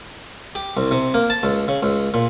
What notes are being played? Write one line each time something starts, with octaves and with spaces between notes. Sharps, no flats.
G4
C2
C3
A#3
A5
C#2
C#3
C#2
A#2